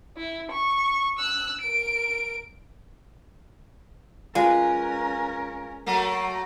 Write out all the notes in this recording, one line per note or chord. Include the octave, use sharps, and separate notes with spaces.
E4
C#6
E6 F#6
A#4 D7
G#3 C#4 F4 A#4 B4
F#3 A3 A#3